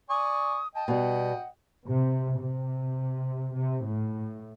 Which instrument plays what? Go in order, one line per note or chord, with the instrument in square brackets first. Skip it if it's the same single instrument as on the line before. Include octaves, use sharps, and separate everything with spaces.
[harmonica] D5 G#5 C#6 [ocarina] D#6
[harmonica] D#5 G5 [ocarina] A5
[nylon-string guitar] B2 G3 [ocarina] F#5
[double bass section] C3
C3
C3
A2